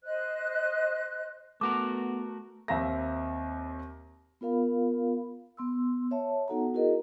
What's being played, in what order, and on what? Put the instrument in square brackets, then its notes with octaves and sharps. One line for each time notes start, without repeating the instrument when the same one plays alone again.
[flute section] C5 D#5 F#6
[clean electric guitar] A3 F#4 A#4 [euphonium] B3 [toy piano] D6
[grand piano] D#2 C4 E5 F5 A#5 A#6
[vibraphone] B3 F4 A#4 F5 B5
B3 C6 E6
C#5 E5 A5
B3 D#4 F#4 A4 F#5 A#5
E4 F#4 G#4 A#4 D#5